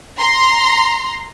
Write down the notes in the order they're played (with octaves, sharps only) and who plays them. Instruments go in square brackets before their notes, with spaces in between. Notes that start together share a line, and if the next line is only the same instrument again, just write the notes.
[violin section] A#5 C6